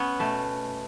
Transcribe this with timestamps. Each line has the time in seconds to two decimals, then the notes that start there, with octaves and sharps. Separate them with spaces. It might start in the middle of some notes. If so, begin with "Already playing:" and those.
Already playing: B3 C#4
0.19 B2 A3